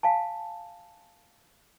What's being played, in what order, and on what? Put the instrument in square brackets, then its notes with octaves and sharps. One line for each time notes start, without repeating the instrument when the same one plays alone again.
[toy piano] F5 G#5 A5